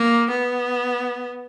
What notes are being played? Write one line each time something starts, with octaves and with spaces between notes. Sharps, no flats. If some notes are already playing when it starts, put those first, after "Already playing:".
Already playing: A#3
B3